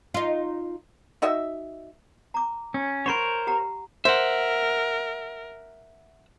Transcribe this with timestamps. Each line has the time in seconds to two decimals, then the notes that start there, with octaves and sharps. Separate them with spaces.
0.14 D#4 F4
1.22 D#4 F#4 D#5 E5
2.34 A#5 D6
2.74 C#4
3.06 A#4 C5 C#5 F#5 B5 C#6
3.47 G4 F#5 A#5
4.05 A#4 C5 E5 F#5